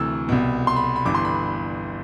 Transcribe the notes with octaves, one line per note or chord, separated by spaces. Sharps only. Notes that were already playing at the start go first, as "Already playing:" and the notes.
Already playing: D2 C3 E3 E6
C2 B2
C6
B5
B5
G1 G2 E3 D6
C6
B5